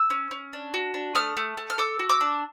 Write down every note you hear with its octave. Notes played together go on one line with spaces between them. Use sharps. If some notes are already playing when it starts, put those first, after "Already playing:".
Already playing: E6
C#4
C#4
D4
F#4
D4
A3 D#6 F6
A3
A3
F6
A4 D6 E6
F#4
D6 E6
D4